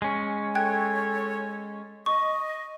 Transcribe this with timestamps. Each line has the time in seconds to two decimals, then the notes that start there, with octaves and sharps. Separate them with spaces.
0.02 G#3 C#4
0.55 A4 C#5 G5 F#6 G#6
2.06 D#5 C#6